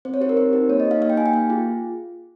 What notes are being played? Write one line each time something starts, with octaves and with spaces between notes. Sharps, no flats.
C4 C5
C#5
D#4 G4 A#4 C5
C4 C5
D#4 G4
A#3 C#5
D#5
G4
D#4 F5
A#3 F5
G5
D#4 G4 G#5
G5
A#3 F5
F4 G#4